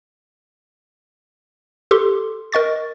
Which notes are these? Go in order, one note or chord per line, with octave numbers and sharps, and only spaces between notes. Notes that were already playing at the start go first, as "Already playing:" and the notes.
G4 A4 C6
A#4 D#5 C#6 A6